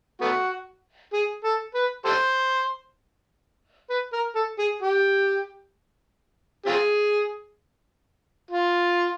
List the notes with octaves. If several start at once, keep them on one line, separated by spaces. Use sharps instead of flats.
A3 B3 F#4
G#4
A4
B4
G4 A4 C5
B4
A#4
A4
G#4
G4
C4 F4 G#4
F4